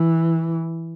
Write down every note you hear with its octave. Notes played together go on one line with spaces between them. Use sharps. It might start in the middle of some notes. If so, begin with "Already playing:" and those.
Already playing: E3